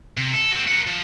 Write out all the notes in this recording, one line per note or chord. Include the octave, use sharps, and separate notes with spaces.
C3
A4
C4 F#4
A#4 F#5
F3